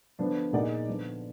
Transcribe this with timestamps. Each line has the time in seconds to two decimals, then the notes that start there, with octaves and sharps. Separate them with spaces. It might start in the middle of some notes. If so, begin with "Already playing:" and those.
0.19 D3 F3 B3 D4
0.53 A#2 G#3 D#4 A#4 D5
0.87 D3 F3 B3